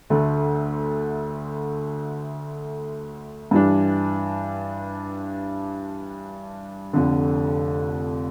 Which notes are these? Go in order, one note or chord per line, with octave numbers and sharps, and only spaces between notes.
D2 D3 A3
G2 E3 G3 D4
F1 F2 D3